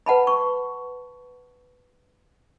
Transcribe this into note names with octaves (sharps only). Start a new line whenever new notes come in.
B4 F#5 A5 B5
C#6